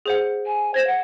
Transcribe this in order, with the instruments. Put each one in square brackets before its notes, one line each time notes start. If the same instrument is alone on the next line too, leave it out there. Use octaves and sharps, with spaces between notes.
[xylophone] G#4 C5 F#5
[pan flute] G#5
[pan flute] C5 [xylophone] G#6 A#6 E7
[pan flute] F#5